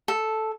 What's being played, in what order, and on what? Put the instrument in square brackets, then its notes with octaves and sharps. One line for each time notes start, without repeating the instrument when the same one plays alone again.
[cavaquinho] A4